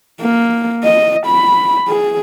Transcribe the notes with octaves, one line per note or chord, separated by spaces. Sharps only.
A#3
D#5
B5
G#4